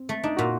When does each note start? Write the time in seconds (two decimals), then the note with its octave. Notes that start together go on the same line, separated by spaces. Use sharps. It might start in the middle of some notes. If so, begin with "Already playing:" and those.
Already playing: C4
0.09 A3
0.24 D4 D#4
0.37 A#2 F#4